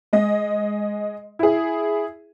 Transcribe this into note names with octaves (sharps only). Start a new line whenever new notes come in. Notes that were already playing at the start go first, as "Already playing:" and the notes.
G#3 D#5
E4 G#4